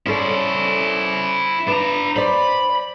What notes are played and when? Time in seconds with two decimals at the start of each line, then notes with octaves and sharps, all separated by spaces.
0.06 C#4 E4 A4 C5 D5
1.68 D4 B4 A#5
2.16 C5 D5 B5